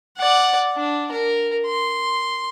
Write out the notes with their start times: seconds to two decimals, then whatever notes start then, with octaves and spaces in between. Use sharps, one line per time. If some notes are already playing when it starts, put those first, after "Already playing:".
0.17 D5 F#5
0.76 D4
1.12 A#4
1.66 C6